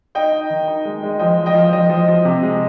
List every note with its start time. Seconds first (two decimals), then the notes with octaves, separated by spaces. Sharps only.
0.15 D#4 D#5 G5
0.32 D#4
0.50 D#3
0.68 D#4
0.85 G#3
1.03 G#3
1.19 F3 D#5 G5
1.38 F3
1.46 D#5 G5
1.55 F3
1.73 F3 D#5
1.89 F3
2.08 F3
2.25 C3
2.43 G#3